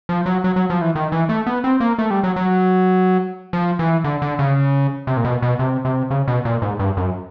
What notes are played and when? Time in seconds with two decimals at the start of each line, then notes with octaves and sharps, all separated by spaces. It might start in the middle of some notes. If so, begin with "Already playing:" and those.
0.09 F3
0.26 F#3
0.44 F#3
0.56 F#3
0.70 F3
0.82 E3
0.95 D#3
1.12 E3
1.29 A3
1.47 B3
1.64 C4
1.80 A#3
1.98 A3
2.11 G3
2.23 F#3
2.36 F#3
3.53 F3
3.79 E3
4.04 D3
4.22 D3
4.39 C#3
5.07 C3
5.17 A#2
5.24 B2
5.42 B2
5.59 C3
5.85 C3
6.10 C#3
6.28 B2
6.45 A#2
6.62 G#2
6.79 G2
6.97 F#2